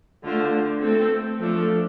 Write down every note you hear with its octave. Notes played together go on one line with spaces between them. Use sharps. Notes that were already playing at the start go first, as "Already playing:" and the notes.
D3 A3 D4 F4 C5
A3 C4 A4
F3 A3 D4 A4